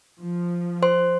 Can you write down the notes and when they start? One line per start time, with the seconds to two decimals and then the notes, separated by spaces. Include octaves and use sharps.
0.21 F3
0.82 C5 C6